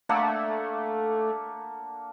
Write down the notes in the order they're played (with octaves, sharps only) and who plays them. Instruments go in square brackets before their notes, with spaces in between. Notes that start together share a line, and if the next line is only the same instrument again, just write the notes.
[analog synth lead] A3 [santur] A#3 D4 F#5